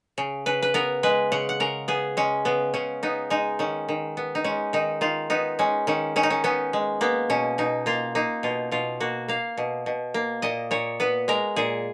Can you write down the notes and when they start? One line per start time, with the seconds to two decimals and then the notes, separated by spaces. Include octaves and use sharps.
0.18 C#3
0.46 C#3 B4
0.62 B4
0.74 B3 A#4
1.03 G#3 B4
1.32 C#3 F#5
1.49 F#5
1.60 C#3 A#4
1.88 B3 G#4
2.17 G#3 C#4
2.45 C#3 B3
2.74 C#3 C#4
3.03 B3 D#4
3.30 G#3 D#4
3.59 D#3 C#4
3.89 D#3
4.17 B3
4.35 D#4
4.44 G#3 C#4
4.73 D#3 D#4
5.01 D#3 F4
5.30 B3 D#4
5.59 G#3 C#4
5.87 D#3 C#4
6.16 D#3 C#4
6.23 D#4
6.30 C#4
6.44 B3 C#4
6.73 G#3
7.01 A#3 B3
7.30 B2 C#4
7.58 B2 D#4
7.86 A#3 F4
8.15 A#3 D#4
8.43 B2 F4
8.71 B2 F4
9.00 A#3 F#4
9.28 A#3 F5
9.57 B2
9.86 B2
10.14 A#3
10.42 A#2 D#5
10.71 A#2 C#5
11.00 B3 B4
11.28 G#3 A#4
11.56 A#2 G#4